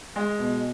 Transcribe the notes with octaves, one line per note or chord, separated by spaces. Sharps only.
G#3
B2